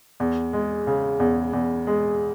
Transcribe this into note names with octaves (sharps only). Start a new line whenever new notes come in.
E2
G#3
C#3
E2
E2
G#3